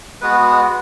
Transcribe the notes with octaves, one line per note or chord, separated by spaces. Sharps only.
G#3 B3 F#4 B4